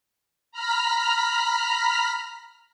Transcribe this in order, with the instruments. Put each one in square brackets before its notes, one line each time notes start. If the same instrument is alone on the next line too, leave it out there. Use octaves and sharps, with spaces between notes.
[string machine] A#5 B5 F6 B6